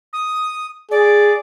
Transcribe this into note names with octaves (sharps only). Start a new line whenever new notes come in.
D#6
G#4 D5